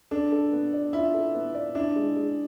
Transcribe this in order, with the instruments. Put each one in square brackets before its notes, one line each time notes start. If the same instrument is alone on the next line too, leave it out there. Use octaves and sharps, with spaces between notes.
[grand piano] D4 [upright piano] A4
[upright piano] A4
B3
D5
[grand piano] E4 [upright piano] F4
[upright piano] A4
B3
D5
[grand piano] D4 [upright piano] E4
[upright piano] G#3
G#3